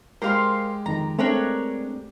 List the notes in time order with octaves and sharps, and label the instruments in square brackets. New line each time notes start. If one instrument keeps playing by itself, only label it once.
[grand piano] G#3 G4 [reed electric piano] A#4 [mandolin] C5 F5 C6
[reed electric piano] F2 D#3 [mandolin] A#5
[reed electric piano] A3 C4 G#4 [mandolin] D4 A#4 C#5